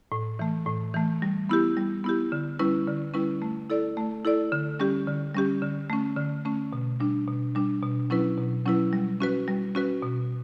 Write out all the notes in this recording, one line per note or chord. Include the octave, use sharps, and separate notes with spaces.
A2
E3 A3
A2
E3 A3
G3
B3 E4 G4
G3
B3 E4 G4
D3
G3 C#4 E4 B4
D3
G3 C#4 E4 B4
A3
E4 A4 D5
A3
E4 A4 D5
D3
G3 C#4 G4
D3
G3 C#4 G4
D3
A3 C#4
D3
A3 C#4
B2
G3 D4
B2
G3 D4
B2
F#3 C#4 E4 B4
B2
F#3 C#4 E4 B4
G3
C#4 F#4 B4
G3
C#4 F#4 B4
B2